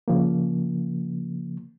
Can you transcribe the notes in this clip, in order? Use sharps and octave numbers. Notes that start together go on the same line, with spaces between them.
C#3 F3 A#3